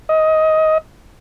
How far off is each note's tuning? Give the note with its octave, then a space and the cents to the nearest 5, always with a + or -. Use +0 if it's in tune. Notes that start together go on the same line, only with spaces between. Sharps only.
D#5 +15